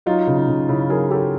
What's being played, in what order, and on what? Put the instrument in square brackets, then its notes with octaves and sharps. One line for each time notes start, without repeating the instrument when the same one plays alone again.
[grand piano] F#3 D#4 F4
C#3
D#4
C#3
C#3 E4
F#3 G#4 A#4
F#3 G4 A4